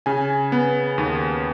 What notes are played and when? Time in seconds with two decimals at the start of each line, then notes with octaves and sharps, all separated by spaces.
0.06 C#3 G#5
0.52 B3
0.98 D#2